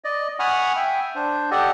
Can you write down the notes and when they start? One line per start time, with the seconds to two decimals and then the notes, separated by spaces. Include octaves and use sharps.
0.04 D5 D#5
0.39 F#5 G#5 B5 C#6 D#6 F6
0.76 E5 G5
1.15 D4 C5
1.51 G4 A4 D5 D#5 F#5